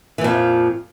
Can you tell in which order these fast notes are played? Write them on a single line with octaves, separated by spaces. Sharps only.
E3 A#2 F2 F3